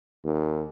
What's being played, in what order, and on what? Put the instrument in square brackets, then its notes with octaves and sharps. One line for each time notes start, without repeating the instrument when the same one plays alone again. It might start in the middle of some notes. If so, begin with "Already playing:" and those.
[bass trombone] D#2